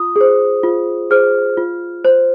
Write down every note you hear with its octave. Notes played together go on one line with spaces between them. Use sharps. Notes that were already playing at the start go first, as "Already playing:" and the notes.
Already playing: F4 D#6
G#4 C5
F4
G#4 C5 F6
F4
C5